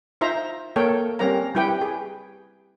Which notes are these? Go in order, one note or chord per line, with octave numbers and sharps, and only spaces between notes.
D#4 F4 C5 E5 A#5
A#3 A4 C#5 G5
G3 C4 C#4 A#4 F5 A#5
G3 E4 G4 B4 G5
G#4